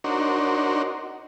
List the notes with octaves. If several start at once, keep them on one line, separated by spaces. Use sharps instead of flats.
D4 D#4 F#4 A#4 C5 C#5